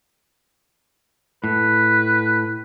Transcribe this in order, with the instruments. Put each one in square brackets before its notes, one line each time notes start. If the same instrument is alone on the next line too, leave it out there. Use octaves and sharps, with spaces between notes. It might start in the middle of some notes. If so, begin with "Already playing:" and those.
[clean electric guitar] A2 [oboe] B4